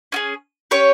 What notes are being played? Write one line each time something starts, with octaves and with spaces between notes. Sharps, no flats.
C#4 F4 G#4
C#4 G4 C#5